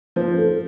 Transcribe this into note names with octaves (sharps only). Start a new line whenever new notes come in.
F3 C5
A4